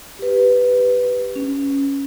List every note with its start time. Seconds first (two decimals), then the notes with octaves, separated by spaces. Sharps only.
0.19 G4 B4
1.36 C#4